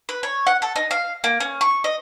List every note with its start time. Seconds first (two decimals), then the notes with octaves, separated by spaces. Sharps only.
0.09 B4
0.23 C#5
0.47 F#5
0.62 A4
0.76 D#4
0.91 F5
1.24 A#3
1.40 C#4
1.61 C#6
1.84 D#5